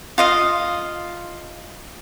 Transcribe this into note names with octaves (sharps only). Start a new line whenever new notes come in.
F4 D#5 F5